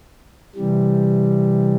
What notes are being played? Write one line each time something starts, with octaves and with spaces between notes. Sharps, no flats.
C3 E3 G3